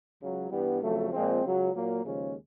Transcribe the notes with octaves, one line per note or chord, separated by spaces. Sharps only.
C#2 C#3 F#3
G2 E3 G3 B3
F2 C#3 F#3 A3
A#2 F3 G#3 C4
C#2 C#3 F#3
A#2 F#3 A#3
D#2 C#3 F3 G#3 C#4